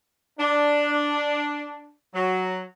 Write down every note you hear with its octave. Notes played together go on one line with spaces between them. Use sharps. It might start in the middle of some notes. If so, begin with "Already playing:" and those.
D4
F#3